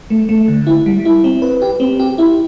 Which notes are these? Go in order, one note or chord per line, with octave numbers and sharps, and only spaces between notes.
A3
A3
D3
E4
G3
E4
C4
B4
G4
C4
G4
E4